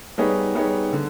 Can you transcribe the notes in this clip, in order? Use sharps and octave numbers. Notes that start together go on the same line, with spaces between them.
G3 B3 D#4 G#4 C#5
G3 B3 D#4 G#4 C#5
D3